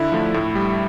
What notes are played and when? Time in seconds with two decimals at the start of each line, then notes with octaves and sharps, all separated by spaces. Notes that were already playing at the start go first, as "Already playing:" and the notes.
Already playing: D3 E4
0.12 F3 A3
0.34 A2
0.55 G3